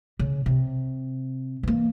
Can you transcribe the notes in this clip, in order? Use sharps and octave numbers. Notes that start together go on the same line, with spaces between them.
C#3
C3
E3 A#3